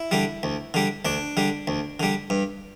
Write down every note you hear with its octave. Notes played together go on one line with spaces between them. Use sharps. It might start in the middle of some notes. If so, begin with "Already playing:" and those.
Already playing: E4
D3 G3
D2
D3 G3
D2 D4
D3 G3
D2
D3 G3
G2